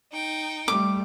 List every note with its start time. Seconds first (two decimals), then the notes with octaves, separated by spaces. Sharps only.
0.12 D#4 G5
0.68 G3 A3 D6